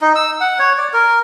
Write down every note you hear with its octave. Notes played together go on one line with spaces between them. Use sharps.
D#4
E6
F#5
C#5
D5
A#4